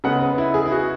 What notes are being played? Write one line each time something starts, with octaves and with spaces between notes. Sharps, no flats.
C#3 G#3 B3 F#5
B4
E4
G#4
E4
F#4